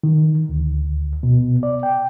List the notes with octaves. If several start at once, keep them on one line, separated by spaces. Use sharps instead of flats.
D#3
D2
B2
D5
G5